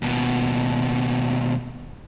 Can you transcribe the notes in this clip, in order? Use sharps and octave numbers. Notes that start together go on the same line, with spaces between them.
D#2 B2